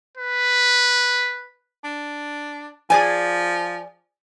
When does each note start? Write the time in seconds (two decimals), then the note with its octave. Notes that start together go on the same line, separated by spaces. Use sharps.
0.17 B4
1.84 D4
2.90 F3 G#4 D5 G#5